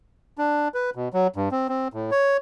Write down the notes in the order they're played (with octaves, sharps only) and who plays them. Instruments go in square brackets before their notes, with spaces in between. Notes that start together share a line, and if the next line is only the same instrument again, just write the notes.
[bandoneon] D4
B4
B2
F#3
G2
C4
C4
A2
C#5